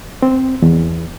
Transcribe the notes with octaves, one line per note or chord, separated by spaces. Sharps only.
C4
E2